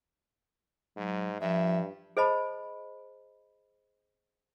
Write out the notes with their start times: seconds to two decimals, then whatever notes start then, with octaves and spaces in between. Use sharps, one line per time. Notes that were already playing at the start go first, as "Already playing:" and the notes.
0.97 G#2 F#3
1.41 G2 F3 E5
2.17 G#4 C5 D#5 A5 B5